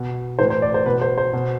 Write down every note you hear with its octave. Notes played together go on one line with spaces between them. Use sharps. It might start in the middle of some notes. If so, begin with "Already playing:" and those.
Already playing: B2
A2 E3 C5
C5
D5
C5
B2 B4
C5
C5
B2